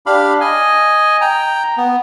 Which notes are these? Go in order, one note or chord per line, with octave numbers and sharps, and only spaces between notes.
D4 G4 F5 B5
D#5 G#5
G5 A#5
B3